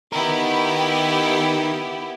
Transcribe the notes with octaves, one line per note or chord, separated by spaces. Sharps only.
B3 D#4 E4 G4 A#4